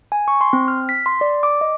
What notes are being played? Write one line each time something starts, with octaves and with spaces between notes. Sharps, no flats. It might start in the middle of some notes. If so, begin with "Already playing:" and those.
G#5
C#6
C6
C4
F6
B6
C6
D5
D6
D#5